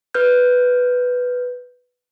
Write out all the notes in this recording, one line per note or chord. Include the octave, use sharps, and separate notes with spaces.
B4 F6 G6